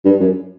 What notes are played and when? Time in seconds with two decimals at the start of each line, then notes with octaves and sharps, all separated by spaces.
0.05 G2
0.20 F#2